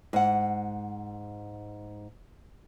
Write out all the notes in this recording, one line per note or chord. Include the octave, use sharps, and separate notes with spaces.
G#2 F#5